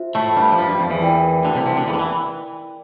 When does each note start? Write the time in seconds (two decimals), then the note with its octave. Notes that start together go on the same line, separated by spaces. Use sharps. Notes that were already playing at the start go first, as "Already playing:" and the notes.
Already playing: F4 C5 E5
0.15 A2 A3
0.36 G2 G3
0.52 F3
0.58 G2 G3
0.69 G2 G3
0.80 F2 F3
0.90 E2 E3
1.01 E4 A#4 D5 G5
1.44 D2 D3
1.55 C2 C3
1.66 C2 C3
1.77 D2 D3
1.88 E2 E3
1.94 D3
1.99 E3